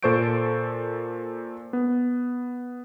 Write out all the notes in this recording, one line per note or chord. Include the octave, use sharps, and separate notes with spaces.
A#2 A4 C5 C#6 G6 D7
B3